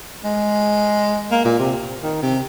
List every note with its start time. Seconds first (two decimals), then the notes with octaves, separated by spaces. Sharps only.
0.24 G#3
1.31 A#3
1.45 A#2
1.59 C3
2.03 D#3
2.22 C3